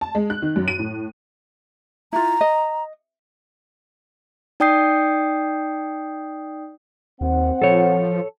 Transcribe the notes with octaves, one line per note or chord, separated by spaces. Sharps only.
A5
G#3
F#6
D#3
F#2
D#7
A2
E4 F4 A#5
D#5
D#4 D5 G5 D#6 G6 C7
D#2 C4 F#5
F3 A4 C#5